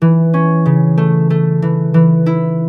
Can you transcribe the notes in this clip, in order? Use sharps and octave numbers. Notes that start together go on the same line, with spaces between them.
E3
C#4
C#3
A3
A3
E3
E3
E4